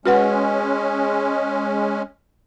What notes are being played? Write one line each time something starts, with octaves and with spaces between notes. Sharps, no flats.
G#3 C#4 F#4 B4 F#5